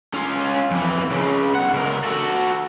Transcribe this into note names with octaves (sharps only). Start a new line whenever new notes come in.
C#4 F4
F2 E3
C#2 C#3
B1 F#5
C#2 A#4
F#4 A4